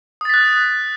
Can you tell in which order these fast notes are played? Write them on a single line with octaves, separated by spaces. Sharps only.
D#6 A6 B6 F#6